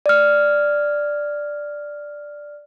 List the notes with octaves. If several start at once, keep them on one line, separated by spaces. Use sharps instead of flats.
D5 F6